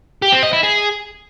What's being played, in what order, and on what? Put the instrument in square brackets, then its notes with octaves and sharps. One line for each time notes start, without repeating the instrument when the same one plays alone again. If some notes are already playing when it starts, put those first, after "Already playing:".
[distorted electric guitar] G4
C4
D#5
E4
G#4